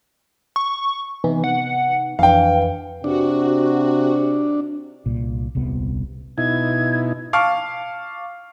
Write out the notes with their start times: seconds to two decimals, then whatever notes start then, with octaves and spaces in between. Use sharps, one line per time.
0.56 C#6
1.24 C3 E3 B3 D#4
1.44 F#5
2.19 F2 E3 D4 F5 G5
3.04 C3 D4 F#4
5.06 C2 A#2
5.55 D#1 C2 C3 B3
6.38 B2 D#4 E4 G#6
7.33 F5 A5 C#6 D6 F6